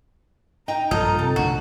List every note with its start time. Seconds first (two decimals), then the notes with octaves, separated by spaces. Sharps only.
0.68 D#4 G5 A#5
0.91 A#1 G2 F3 D#4 F4 A4
1.18 C3 A4 A5
1.36 B1 A2 D3 F#4